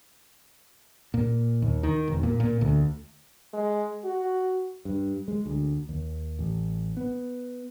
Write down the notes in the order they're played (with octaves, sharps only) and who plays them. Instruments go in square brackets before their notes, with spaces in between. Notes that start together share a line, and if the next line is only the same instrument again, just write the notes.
[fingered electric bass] A#2
D#2
D#3
E1
A#2
A#2
D2
[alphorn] G#3
F#4
[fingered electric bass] G2
G#3
D2
D#2
A1
B3